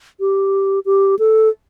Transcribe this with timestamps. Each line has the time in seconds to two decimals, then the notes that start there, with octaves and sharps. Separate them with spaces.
0.20 G4
0.86 G4
1.19 A4